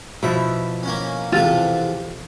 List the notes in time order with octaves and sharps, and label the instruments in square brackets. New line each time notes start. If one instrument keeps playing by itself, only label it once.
[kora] B2 F3 E4 [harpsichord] E5
[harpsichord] A#3 C#4
[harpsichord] E2 C3 A4 [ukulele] F4